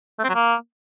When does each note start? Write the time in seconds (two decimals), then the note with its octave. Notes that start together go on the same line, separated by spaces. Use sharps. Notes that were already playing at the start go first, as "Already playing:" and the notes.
0.19 A3
0.24 C4
0.29 F#3
0.34 A#3